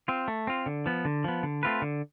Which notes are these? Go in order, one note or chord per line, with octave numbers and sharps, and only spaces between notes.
C4 F4
A3
C4 F4
D3
F3 B3
D3
F3 B3
D3
A3 C4 F4 B4
D3